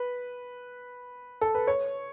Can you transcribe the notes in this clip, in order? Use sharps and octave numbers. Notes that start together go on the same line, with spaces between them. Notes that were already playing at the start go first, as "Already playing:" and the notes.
Already playing: B4
A4
B4
C#5